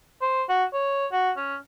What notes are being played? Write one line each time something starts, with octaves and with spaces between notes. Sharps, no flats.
C5
F#4
C#5
F#4
C#4